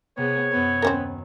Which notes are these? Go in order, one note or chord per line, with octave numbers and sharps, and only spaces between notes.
C3 B3 G#4 C#5
F#2 B3 G#6
D#2 C4 C#4 A#4